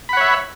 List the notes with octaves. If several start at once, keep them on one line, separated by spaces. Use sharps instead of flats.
C#5 E5 F#5 B5